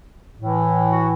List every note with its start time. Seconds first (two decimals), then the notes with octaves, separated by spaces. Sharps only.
0.39 A2 E3
0.91 F#4